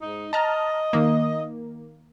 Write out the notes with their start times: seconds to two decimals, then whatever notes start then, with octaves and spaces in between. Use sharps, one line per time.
0.01 G#2 D#4
0.33 D#5 A5 A#5 F6
0.93 D#3 A#3